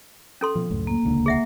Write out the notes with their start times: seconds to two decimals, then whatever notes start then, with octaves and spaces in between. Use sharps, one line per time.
0.41 C#4 A4 C6
0.55 B2 F3
0.71 C#2 F#2 A2
0.87 A#3
1.03 D#1 C#2 D3
1.26 G#4 E5 F#5